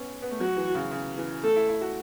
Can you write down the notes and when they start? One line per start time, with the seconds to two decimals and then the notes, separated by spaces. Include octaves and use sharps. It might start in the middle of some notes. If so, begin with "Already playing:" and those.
Already playing: B3 C#4
0.22 B3
0.31 A3
0.40 F#3 F#4
0.57 E3
0.75 C#3
0.91 C#3
1.18 E3
1.43 A3 A4
1.56 E4
1.69 E4
1.81 F#4